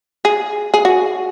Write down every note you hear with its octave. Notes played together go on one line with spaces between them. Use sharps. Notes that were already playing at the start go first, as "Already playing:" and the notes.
G#4
G#4
F#4